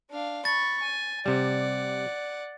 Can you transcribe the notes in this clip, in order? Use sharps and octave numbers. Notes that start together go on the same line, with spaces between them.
D4 F5
B5 C#6 A6
G#5
C3 G3 D5 F#5